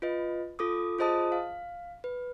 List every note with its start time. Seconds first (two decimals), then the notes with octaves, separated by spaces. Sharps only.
0.02 F4 B4 D#5
0.59 F4 A4 D6 D#6
0.99 F4 G#4 C5 D#5 A5 D#6
1.32 F5
2.04 B4